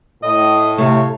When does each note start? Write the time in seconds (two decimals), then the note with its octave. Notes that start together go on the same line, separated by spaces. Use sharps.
0.23 A2 D#5
0.78 C3 A3 C#5 F5